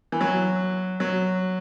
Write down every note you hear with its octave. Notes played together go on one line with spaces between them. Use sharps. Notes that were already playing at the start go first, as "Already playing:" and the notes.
E3
F#3
F#3